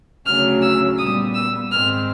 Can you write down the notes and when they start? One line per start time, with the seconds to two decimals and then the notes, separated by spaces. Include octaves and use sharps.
0.26 D2 C#3 F#3 F6
0.62 E6
0.98 A#2 G3 B3 D#6
1.34 E6
1.70 G#2 D#3 G#3 C4 F6